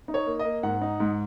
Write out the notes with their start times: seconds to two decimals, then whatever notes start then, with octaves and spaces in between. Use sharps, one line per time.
0.08 D#4
0.14 C#5
0.27 A#3
0.39 D#5
0.45 A#3
0.63 G#2 F#5
0.82 D#4
1.00 G#2